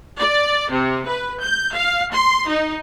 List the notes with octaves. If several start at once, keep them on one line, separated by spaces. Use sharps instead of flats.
D5
C3
B4
G6
F5
C6
D#4